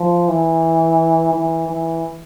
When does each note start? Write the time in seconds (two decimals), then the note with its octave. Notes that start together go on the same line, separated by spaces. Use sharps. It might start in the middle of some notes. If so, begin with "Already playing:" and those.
Already playing: F3
0.28 E3
1.33 E3
1.68 E3